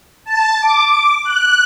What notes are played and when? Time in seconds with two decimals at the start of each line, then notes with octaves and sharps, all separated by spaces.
0.25 A5
0.61 D6
1.24 F#6